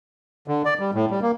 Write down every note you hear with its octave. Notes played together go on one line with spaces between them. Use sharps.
D3
D5
G3
A2
G3
A#3